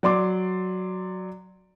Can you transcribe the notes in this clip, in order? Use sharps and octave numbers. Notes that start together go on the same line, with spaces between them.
F#3 D5 C6 D6